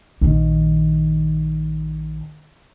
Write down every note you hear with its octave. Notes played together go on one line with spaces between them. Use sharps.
A#1 D#3